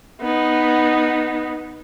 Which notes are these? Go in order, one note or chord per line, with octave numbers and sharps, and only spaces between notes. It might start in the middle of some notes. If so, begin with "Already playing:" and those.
B3 D#4